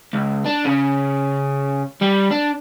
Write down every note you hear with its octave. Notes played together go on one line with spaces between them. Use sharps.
C#2
D4
C#3
G3
D4